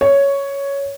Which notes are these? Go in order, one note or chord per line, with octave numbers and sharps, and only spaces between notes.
C#5